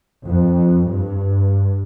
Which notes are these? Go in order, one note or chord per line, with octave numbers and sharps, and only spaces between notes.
F2
G2